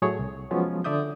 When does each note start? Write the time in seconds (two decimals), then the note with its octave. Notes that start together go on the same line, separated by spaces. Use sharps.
0.02 A2 F#3 A3 G#4 C#5
0.19 C2
0.51 F3 F#3 G#3 B3 C#4 F4
0.84 D3 D5 E5 D#6 G6